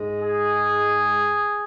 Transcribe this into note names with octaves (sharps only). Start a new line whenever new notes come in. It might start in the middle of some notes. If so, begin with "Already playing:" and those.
Already playing: G#2 G#3
G#4